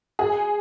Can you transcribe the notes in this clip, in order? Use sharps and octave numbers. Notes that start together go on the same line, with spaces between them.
G#4